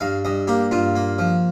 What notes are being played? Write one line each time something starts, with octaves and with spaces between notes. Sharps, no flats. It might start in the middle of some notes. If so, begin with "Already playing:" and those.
G2 F5
G2 D#5
A#3 G4
G2 F4
A#3
F3